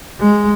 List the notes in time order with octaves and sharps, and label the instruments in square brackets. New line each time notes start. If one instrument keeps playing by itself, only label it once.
[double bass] G#3